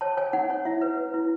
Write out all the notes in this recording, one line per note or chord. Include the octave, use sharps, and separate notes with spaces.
C#5 A5
C#5 G#5
D#4 F#5
C#5
E4 E5
B4
B4
E4